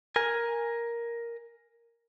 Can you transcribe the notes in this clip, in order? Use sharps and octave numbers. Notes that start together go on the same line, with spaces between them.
A#4 G#5